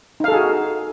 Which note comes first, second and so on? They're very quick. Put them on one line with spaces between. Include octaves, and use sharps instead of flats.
D#4 F5 A4 G#4 F#4